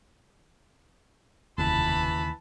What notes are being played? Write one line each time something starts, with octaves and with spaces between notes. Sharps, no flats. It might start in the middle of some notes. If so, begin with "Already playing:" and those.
F1 D#2 C#3 E3 A5 B5